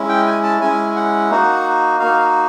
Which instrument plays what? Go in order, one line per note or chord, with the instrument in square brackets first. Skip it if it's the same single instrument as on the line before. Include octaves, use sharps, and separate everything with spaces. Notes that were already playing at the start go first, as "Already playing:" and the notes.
Already playing: [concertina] G#3 C#4 E4
G5
G#5
A5
G#3 C#4 E4 G#5
F#5
A#3 D#4 F#4
A#3 D#4 F#4 F5